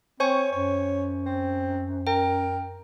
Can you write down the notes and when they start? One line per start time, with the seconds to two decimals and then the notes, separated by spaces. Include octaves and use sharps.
0.20 C4 C5 C#5 G#5 C#6
0.52 F#2 C#5
1.26 C4
2.07 A#4 G5